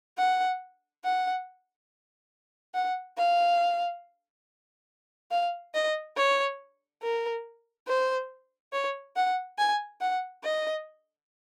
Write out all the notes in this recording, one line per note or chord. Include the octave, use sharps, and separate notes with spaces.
F#5
F#5
F#5
F5
F5
D#5
C#5
A#4
C5
C#5
F#5
G#5
F#5
D#5